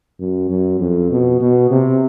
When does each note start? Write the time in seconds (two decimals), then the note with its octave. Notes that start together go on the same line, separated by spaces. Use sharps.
0.20 F#2
0.50 F#2
0.80 F2
1.11 B2
1.41 B2
1.71 C3